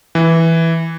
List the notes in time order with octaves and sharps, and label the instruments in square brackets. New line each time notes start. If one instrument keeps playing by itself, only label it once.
[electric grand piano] E3